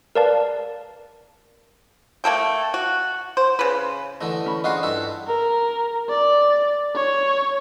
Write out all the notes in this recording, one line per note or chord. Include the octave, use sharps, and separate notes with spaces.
A#4 B4 D5 F5 A5
A3 A#3 A4 G5
F#4
C5
C#3 B4
D3 E3 A3 D#5
C#4 B5
D4 F4 F#4 G#4 C5 D#5
G2 E4 A4
A#4
D5
C#5